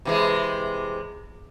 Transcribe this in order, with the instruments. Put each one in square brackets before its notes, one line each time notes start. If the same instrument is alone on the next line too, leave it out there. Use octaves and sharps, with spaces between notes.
[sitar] C3 E3 G#3